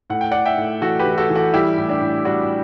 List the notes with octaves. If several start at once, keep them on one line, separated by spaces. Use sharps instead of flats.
A2 F#5
G5
A2 D5 F#5
E5 G5
A2
E3 F#4 A4
G4 B4
E3
F#4 A4
E3
F#4 A4
G3 E4 G4
A2
D4
A2
G3 D4 F#4